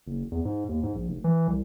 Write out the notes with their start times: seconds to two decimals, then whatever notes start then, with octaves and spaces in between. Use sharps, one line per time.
0.07 F#1
0.32 E2
0.45 G#2
0.69 D#2
0.83 G#2
0.95 A#1
1.08 F1
1.24 E3
1.48 C2